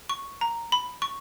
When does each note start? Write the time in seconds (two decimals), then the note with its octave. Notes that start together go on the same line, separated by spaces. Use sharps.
0.09 C#6
0.41 A#5
0.72 B5
1.02 C#6